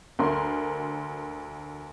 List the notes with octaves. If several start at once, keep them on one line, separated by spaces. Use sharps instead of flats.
D2 A#4 C6